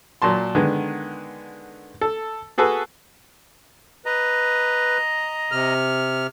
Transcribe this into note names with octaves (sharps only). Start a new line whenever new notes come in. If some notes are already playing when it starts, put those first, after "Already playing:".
A#2 F#3 A5 C6
D3 D#3 G#3 B3
A4
F#4 G#4 A4 B4
B4 D#5 A#5
C3 F6